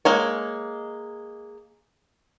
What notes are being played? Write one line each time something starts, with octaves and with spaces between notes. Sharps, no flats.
G#3 A#3 C#5